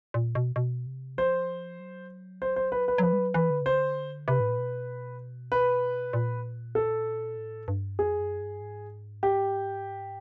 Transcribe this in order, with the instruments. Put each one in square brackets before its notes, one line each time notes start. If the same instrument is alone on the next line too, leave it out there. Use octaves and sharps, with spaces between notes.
[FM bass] A#2
B2
B2
C3
[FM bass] F3 [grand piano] C5
[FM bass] F#3
[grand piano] C5
C5
B4
B4
[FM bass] F#3
[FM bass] F3 [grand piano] B4
[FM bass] G3
F#3
[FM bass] E3 [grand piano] B4
[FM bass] D3
[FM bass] C#3 [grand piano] C5
[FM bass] D3
[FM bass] C3 [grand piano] B4
[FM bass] A2
A#2
B2
[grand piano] B4
[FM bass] A#2
[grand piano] A4
[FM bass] A2
G2
[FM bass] F2 [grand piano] G#4
[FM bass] F#2
G2
G#2
[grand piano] G4